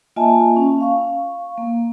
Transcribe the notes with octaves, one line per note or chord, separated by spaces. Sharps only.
A#3 F4 D#5 E5 G#5 A5
C#4
F5 C#6
A#3